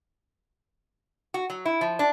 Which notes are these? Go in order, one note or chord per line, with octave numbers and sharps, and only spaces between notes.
F#4
F#3
E4
F3
D4